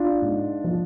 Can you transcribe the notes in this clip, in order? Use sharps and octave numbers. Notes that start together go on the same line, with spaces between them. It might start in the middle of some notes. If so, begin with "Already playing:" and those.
Already playing: D4 F4
G#2
F3